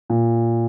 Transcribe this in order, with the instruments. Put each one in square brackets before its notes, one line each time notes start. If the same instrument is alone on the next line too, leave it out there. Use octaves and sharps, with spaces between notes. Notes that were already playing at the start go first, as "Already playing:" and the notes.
[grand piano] A#2